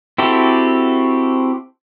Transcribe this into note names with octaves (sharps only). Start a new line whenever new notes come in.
C4 E4 F#4 G4 A4